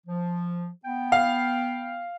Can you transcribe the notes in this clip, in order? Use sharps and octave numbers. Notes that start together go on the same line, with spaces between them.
F3
B3 G5
F5